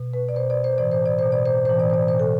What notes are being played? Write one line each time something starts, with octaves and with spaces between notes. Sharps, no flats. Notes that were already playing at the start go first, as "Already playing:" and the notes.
Already playing: B2
B4
D5
B2 C5
D5
C5
A2 E3 D5
C5
D5
B2 C5
D5
C5
A2 E3 C5
D5
C5
D5
B2 C5
A4